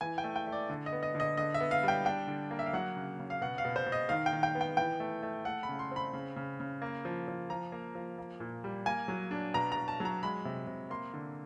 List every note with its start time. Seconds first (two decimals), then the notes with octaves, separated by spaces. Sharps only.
0.01 E3 G#5
0.18 G5
0.24 A3
0.36 G5
0.47 A3
0.52 D5
0.70 D3
0.86 D#5
0.92 B3
1.03 D#5
1.15 D3
1.20 D#5
1.37 D3 D#5
1.54 E5
1.61 B3
1.71 F5
1.83 G3 G5
2.05 D4 G5
2.27 D3
2.51 A#3
2.59 E5
2.66 F5
2.73 F#3 F#5
2.96 C#3
3.19 C#3
3.30 F5
3.41 B2 F#5
3.58 F5
3.65 B2
3.76 C5
3.86 B2
3.92 D#5
4.09 D#3 F5
4.26 G5
4.33 D#3
4.43 G5
4.55 B3
4.61 G5
4.77 E3 G5
5.00 A3
5.23 A3
5.45 A3 F#5
5.63 B5
5.69 C#3
5.79 C6
5.91 C4 B5
6.13 C#3
6.36 C#3
6.60 C#3
6.82 A#3
7.05 F3
7.28 F3
7.50 F3 A#5
7.72 A#3
7.95 F3
8.18 A#3
8.40 A#2
8.64 G3
8.86 A#3 G#5
9.08 F#3
9.31 D4
9.54 B2 A#5
9.72 B2 A#5
9.88 A5
10.00 F#3 A#5
10.23 G#3 B5
10.45 C3
10.67 C3
10.90 A#3 C6
11.14 D3